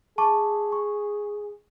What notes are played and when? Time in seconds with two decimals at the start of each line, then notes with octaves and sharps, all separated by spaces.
0.18 G#4 A5 C#6 D6
0.72 C#6